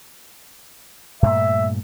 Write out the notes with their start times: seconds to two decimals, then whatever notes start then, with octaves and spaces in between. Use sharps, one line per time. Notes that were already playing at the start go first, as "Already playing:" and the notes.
1.23 G2 A#2 A3 E5